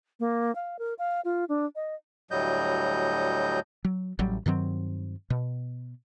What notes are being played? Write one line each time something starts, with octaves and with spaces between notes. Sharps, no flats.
A#3
F5
A#4
F5
F4
D4
D#5
D2 A2 F#3 G3 D#5 G6
F#3
A1 F#3 G3
G2 D#3 F#3 C4
B2